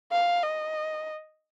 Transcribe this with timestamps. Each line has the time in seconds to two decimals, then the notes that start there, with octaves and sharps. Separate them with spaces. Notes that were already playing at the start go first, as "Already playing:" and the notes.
0.12 F5
0.43 D#5